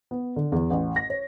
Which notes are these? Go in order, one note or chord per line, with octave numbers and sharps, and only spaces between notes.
B3
D3
E2
A1
A#6
C#5